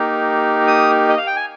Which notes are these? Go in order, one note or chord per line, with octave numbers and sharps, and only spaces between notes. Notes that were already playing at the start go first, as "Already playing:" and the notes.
Already playing: A#3 D#4 G4
D#6
D#5
F5
G5
G#5